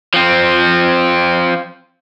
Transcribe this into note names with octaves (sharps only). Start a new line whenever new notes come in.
F3 C4